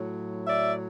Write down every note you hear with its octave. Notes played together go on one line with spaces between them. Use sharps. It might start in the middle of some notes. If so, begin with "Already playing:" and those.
Already playing: A2 F#3
D5 E5